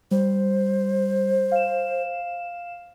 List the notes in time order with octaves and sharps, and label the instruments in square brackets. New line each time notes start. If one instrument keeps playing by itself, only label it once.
[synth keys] G3 [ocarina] C5
[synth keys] F5 E7